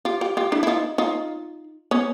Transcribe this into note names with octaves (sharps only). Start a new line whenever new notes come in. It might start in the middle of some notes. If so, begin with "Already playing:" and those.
F4 G4
F4 G4
F4 G4
D4 E4
E4
D#4 F4
D#4 F4
B3 C#4